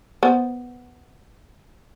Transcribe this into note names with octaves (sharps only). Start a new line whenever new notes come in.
B3 C5